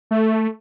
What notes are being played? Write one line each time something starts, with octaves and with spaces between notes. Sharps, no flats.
A3